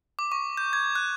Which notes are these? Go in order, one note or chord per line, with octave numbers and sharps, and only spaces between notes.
D6
C#6
G6
G#6
F#6